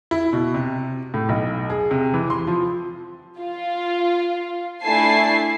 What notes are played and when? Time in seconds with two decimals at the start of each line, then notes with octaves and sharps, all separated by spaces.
0.11 E4
0.33 B2
0.54 C3
1.14 A2
1.29 B1
1.70 G#4
1.91 C3
2.14 E3
2.30 C6
2.47 F3
3.40 F4
4.83 A3 D4 E4 G#5 A5 C7